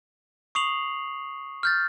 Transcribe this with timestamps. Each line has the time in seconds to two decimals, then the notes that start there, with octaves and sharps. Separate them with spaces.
0.55 C#6 D#6 C7 F7 F#7
1.63 F6 G6 A6